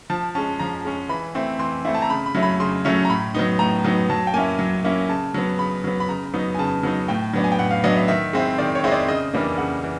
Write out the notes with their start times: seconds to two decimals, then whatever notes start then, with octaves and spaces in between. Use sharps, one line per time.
0.10 F3 A5
0.35 G#3 C#4 A5
0.59 F3 A#5
0.85 G#3 C#4
1.09 E3 B5
1.35 A3 C4 E4
1.59 E3 C6
1.85 A3 C4 E4
1.94 A5
2.02 A#5
2.10 C#3 B5
2.26 B5
2.35 F#3 A3 C#4 E4
2.43 B5
2.60 C#3 C6
2.85 F#3 A3 C#4 E4
3.05 A#5
3.09 A2 B5
3.35 F#3 B3 D#4
3.59 A2 A#5
3.84 F#3 B3 D#4
4.10 F#3 A5
4.27 G5
4.34 A#3 C#4 E4 G#5
4.59 F#3
4.84 A#3 C#4 E4
5.09 C#3 A5
5.34 F#3 B3
5.59 C#3 B5
5.84 F#3 B3
6.00 B5
6.09 C#3 A#5
6.34 F#3 B3 D#4
6.55 G#5
6.59 C#3 A5
6.83 F#3 B3 D#4
7.08 A2 G5
7.33 F#3 B3 D4
7.44 G#5
7.52 G5
7.59 A2 F#5
7.71 F5
7.84 F#3 B3 D4 D#5
7.96 E5
8.08 D#3 E5
8.33 G#3 C4 E4
8.58 D#3 D5
8.75 C#5
8.84 G#3 C4 E4 D#5
8.92 D5
9.08 C#3 D#5
9.33 E3 G3 A#3 D4
9.58 C#3 F#5
9.84 E3